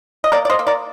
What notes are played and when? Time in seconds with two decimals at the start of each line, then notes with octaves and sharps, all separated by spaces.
0.24 D#5
0.32 A#3 A#4 D5
0.45 D5
0.50 C5 D#5
0.59 A#3
0.67 A#4 D5